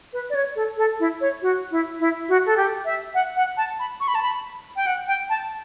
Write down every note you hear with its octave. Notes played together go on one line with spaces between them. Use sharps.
B4
D5
C#5
A4
A4
E4
C#5
F#4
E4
E4
F#4
A4
G4
E5
F#5
F#5
A5
B5
C#6
B5
A5
B5
G5
F#5
G5
A5